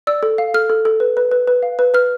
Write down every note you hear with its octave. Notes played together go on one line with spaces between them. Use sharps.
D5 E6
A4
F5
A4 F6
A4
A4
B4
B4
B4
B4
F5
B4
B4 F6